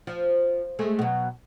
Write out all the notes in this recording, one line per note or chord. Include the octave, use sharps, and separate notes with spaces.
F3
G#3 A3 G#4
B2 F#3